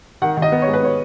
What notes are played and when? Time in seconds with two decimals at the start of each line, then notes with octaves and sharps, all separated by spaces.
0.22 D#3 F#5
0.37 D#3
0.42 D#5
0.52 B3
0.62 C#5
0.67 G#2
0.74 B4
0.83 B3 C#5